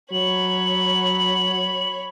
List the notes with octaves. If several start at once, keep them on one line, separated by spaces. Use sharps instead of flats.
F#3 C#5 B5 F#7